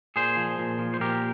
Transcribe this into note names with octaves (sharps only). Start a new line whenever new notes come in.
A#2 G#4 C5
F3
A#2
F3
C5
A#2 G4 A#4